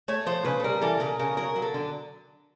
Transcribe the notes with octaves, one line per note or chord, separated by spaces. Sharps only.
A3 C#5
F3 C5
C#3 B4
A4
G3 A#4
E3 A4
C#3 A#4
C#3 A#4
F#3 A#4
F#3
A4
D3